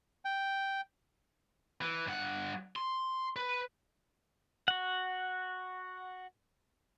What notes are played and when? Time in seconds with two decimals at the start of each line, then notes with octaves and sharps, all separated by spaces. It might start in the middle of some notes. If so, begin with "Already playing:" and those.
0.25 G5
1.81 E3
2.07 G2 F#5
2.76 C6
3.36 B4
4.68 F#4 F#5